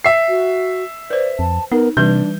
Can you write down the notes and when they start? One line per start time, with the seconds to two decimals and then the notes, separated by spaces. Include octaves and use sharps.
0.04 E5 C7
0.29 F#4
1.10 B4 C5 D5
1.39 F2 A5
1.72 B3 D#4 A#4
1.97 C3 E3 G3 D4 B4 G6